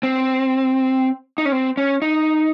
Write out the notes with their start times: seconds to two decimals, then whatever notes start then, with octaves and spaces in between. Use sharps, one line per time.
0.03 C4
1.38 D#4
1.45 C#4
1.52 C4
1.77 C#4
2.02 D#4